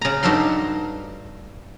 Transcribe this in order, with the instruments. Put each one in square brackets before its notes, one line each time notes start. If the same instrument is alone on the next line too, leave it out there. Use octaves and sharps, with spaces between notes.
[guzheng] C#3 A#5
G2 D#4 F#4 A4 F5 C6